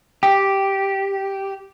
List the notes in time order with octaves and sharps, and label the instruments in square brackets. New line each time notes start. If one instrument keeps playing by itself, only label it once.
[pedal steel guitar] G4 [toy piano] G5